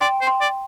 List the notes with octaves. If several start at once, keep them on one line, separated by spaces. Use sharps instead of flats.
D5 G5 C6
C5
G5 C6
D5